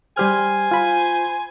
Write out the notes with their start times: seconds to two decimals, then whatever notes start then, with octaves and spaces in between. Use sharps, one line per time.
0.17 G3 G4 C5 G#5 F6
0.71 F4 B5